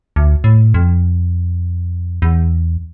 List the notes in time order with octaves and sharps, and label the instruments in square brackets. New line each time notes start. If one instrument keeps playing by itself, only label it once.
[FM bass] D2
A2
F2
E2